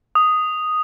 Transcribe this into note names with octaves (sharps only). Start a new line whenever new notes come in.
D#6